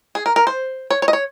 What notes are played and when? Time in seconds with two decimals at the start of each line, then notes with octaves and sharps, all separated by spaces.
0.15 G#4
0.26 A#4
0.36 A#4
0.47 C5
0.91 C#5
1.02 C#5
1.08 D#5
1.13 C#5